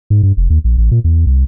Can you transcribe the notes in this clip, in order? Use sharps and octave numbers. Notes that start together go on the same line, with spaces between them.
G#2
G2
F1
D#2
A#1
A1
A#2
E2
C2